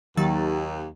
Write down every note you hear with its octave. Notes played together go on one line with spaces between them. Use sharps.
D#2 D#3 F#3 A6